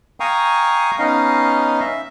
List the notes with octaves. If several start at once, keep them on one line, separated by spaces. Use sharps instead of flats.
F5 G5 G#5 A#5 C#6 D#6
B3 C#4 D#4 D#5 F5
E5